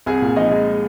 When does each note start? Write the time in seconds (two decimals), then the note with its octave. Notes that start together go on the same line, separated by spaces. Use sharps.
0.06 C2 G#4 G#5
0.22 A#2
0.37 F3 D#4 D#5
0.52 G#3